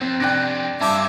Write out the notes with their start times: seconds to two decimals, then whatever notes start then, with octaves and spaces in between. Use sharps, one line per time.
0.01 F2 C4
0.20 F2 C3 D4 G5 F#6 A#6
0.81 G2 C#4 C5 E5 A5 D6